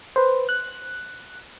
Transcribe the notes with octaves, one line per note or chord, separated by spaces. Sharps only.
B4 C5
F#6